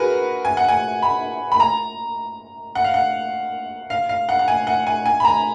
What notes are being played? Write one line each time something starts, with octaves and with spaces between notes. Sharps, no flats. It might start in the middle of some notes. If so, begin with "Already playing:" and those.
Already playing: F#4 G#4 A#4 B4
G#5
F#5
G#5
B5
B5
A#5
F#5
F5
F#5
F5
F5
F#5
F#5
G#5
F#5
G#5
G#5
B5
A#5